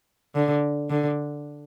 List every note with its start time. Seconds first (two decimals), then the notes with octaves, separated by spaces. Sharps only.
0.36 D3
0.90 D3